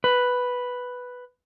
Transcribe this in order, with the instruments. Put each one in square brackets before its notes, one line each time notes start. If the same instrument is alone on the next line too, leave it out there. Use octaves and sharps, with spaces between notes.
[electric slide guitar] B4